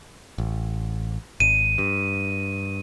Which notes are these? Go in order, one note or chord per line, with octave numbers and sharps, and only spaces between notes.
A1
G#1 D#7
G2